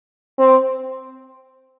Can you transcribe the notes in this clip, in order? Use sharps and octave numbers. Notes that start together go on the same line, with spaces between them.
C4